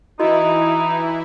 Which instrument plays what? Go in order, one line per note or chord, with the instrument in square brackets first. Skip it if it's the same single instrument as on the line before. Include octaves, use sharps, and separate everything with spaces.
[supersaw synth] E3 E4 [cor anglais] D#4 [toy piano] F#4 D#5